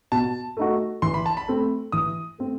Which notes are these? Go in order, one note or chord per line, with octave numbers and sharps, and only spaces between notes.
B2 A5
A3 D#4 F#4
E3 C6
B5
A5
B5
A3 C4
E3 D#6
A3 C4